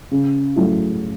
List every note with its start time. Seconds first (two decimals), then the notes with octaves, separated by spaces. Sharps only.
0.11 C#3
0.56 F#3 A3 E4